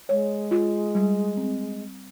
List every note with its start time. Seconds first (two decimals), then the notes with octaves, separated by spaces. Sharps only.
0.09 G#3 C#5
0.51 F4
0.95 G3
1.37 C4